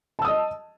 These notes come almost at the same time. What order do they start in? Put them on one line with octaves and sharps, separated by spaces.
A5 E6 D#6 D#5